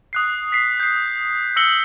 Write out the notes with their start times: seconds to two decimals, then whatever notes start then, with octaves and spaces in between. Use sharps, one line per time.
0.13 D#6 F#6 C7
0.52 B6 C7
0.80 G6 C7
1.56 E6 A#6 C#7 F#7 G7